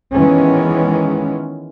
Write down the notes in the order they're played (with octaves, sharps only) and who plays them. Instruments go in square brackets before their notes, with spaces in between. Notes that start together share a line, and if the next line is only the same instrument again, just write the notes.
[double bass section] D#3 E3 G#3 B3 C#4